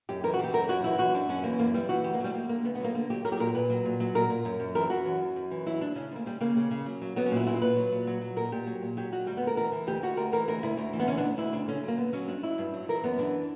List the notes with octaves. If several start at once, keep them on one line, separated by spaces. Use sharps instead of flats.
F#2 G4
E3 A#4
F#4
E3 G4
F#2 A#4
F#2 F#4
E3 E4
F#2 F#4
F#2 D4
F#2 C#4
E3 A#3
F#2 A#3
E3 G3
E3 F#4
D2 G4
A#3
F#3 G3
D2 A#3
D3 A#3
D2 B3
B3
F#3 A#3
D3 A#3
F#3 G4
F#3 A#4
G4
A#2 A#4
A#2 B4
F#3
A#2
F#3
A#2 A#4
A#2
F#2
F#2
E3 A#4
E3 F#4
F#2
F#2
F#2
E3
F#3 E4
D2 D4
C#3 C#4
D2 A#3
C#3 G3
C#3 A#3
C#3
C#3
F#3
F#3
F#3 B3
C#4
A#2
E4
A#2 E4
A#2 B4
F#3
A#2
F#3
F#3
A#2 A#4
A#2 G4
F#3
A#2
F#3 G4
F#3 F#4
D2 G3
B3
D2 A#4
E3 A#4
E3
D2 G4
D2 F#4
D2 A#4
E3 A#4
D2 A#4
D2 E4
D2
E3
B3
D2 C#4
D4
D2
D2 E4
C#3 D4
D3 C#4
F#3 A#3
D3 B3
F#3 C#4
G2 D4
F#3 E4
G2
F#3
E3 A#4
F#2 B3
E3 D4